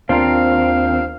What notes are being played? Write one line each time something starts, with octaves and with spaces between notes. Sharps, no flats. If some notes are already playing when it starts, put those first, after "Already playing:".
D#2 C4 D4 F4 A#4 F5